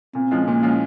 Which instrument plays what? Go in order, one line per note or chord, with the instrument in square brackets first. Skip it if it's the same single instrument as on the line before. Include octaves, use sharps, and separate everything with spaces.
[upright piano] A#2 [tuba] C4
[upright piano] F3 G#3 C#4 F4
[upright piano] A#2 [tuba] A#3
[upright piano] F3 G#3 C#4 F4